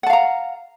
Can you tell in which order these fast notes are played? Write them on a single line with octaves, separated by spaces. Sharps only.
F#5 A5 F5 A#5